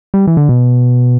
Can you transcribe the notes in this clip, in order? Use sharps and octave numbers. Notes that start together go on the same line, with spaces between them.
G3
E3
D3
B2